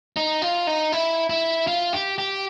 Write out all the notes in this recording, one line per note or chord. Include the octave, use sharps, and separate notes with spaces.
D#4
F4
D#4
E4
E4
F4
G4
G4